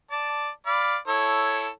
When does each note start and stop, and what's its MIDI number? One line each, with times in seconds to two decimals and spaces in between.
0.11 0.49 74
0.11 0.49 81
0.66 0.97 74
0.66 0.97 77
0.66 0.97 83
1.08 1.69 64
1.08 1.69 69
1.08 1.69 73